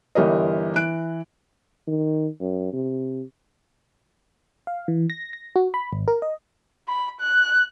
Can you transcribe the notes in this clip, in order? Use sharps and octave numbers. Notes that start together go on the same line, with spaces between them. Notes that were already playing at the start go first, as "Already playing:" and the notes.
G1 E3 G4 A#4 C#5 D#5
E3 F#6 D7
D#3
F#2
C3
F5
E3
A#6
A#6
F#4
B5
G#1
A#4
D#5
B5
F#6